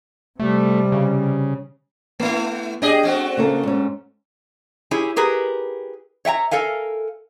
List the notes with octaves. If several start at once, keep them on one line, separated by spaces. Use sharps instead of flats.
C3 G3 A3
C#3
A3 B3 E4
D4 G4 G#4 D#5
A3 C4 F#4
C#3 A#3 A4
G#2 C#4
E4 G4 G#4 C#5 G#5
G4 G#4 A#4 B4
C#5 E5 G5 A#5
A4 A#4 F5 G#5